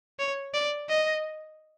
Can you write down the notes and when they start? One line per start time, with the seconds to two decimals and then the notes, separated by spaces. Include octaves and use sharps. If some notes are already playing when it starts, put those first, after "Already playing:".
0.19 C#5
0.54 D5
0.89 D#5